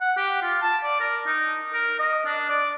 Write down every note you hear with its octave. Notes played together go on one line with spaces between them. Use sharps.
F#5
G4
F4
A5
D5
A#4
D#4
A#4
D#5
D4
D5